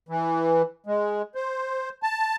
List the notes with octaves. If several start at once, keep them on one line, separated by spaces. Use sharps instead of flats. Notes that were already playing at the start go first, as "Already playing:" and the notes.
E3
G#3
C5
A5